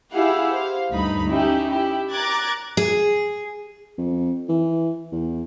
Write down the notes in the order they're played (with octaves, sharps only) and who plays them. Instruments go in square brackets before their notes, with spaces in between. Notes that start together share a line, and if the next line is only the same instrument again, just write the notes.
[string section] E4 G4 G#4 F5 F#5
C5 F5
D2 G2 D3 D#4 B5
C#4 D#4 E4 G4
E4 G4
A#5 D6 F#6 G#6 A6
[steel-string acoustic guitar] G#4
[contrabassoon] F2
E3
E2